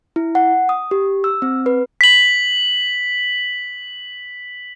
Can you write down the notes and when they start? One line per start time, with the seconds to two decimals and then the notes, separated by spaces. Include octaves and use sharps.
0.16 E4
0.35 F#5
0.69 D#6
0.91 G4
1.24 E6
1.42 C4
1.66 B4
2.01 B6 F#7